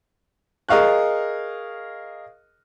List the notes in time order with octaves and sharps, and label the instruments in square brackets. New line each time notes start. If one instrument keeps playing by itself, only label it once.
[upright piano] G#4 A#4 D#5 F5 C#6 F#6